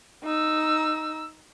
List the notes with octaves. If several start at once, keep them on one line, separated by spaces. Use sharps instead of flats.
D#4 E6